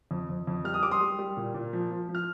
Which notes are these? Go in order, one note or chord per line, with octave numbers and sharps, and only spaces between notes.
F2
F2
F2
G3 F6
D#6
G3 D6
C6 D#6
G3
G3
A#2
A#2
F3
F3
F3
F6